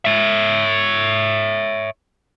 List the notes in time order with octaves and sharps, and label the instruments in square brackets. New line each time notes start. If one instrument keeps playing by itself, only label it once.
[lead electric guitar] C#5 E5